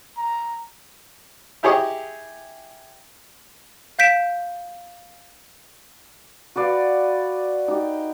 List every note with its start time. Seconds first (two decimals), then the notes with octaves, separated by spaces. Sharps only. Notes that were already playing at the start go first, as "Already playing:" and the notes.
0.17 A#5
1.63 E4 G4 G#4 C#5 D#5
3.99 F5 G6 B6 D7 E7
6.56 F#4 B4 D5 F5
7.68 D#4 G4